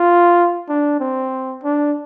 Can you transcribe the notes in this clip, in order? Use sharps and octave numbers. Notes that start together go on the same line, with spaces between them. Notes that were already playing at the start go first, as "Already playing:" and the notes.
Already playing: F4
D4
C4
D4